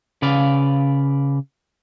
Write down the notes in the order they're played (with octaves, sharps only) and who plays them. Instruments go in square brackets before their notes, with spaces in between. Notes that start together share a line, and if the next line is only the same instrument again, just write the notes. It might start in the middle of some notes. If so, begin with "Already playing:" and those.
[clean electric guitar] C#3 B4 D5 F5